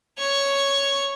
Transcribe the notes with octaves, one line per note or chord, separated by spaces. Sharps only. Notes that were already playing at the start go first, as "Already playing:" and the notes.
C#5 C#6